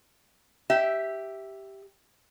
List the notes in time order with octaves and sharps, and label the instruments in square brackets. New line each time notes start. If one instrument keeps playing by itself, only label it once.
[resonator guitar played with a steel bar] G4 E5